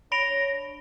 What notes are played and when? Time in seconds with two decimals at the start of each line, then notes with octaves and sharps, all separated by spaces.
0.12 D4 C#5 B5 A#6 D7 F7